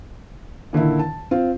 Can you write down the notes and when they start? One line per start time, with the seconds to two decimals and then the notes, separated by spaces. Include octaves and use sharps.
0.73 A#2 D3 D#3 E4
0.99 A5
1.31 C4 F4